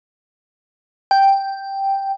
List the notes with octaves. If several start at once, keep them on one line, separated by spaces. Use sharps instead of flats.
G5